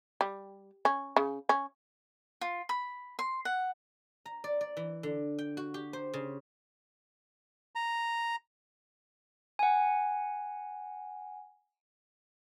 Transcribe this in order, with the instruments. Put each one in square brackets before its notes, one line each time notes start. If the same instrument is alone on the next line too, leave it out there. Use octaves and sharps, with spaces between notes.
[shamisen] G3
C#4
C#3
C#4
[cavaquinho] F4
B5
C6
F#5
[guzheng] A#5
D5
D5
E3
D3
G5
F#4
G4
C5
C#3
[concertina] A#5
[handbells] F#5 G#5